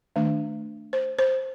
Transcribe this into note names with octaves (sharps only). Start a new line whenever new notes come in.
D#3 A3 D4
C5
C5